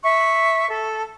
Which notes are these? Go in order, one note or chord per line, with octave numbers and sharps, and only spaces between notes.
E5 C#6
A4